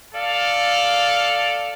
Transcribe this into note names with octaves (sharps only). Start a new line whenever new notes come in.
A4 D5 F5